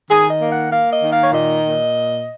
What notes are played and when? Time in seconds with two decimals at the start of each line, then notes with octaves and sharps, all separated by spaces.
0.10 D#3 G#4
0.30 D#5
0.41 A#3
0.51 F#5
0.71 A#3 F5
0.92 D#5
1.02 D#3
1.12 F5
1.23 C#5
1.32 A#2 D#5
1.63 A#2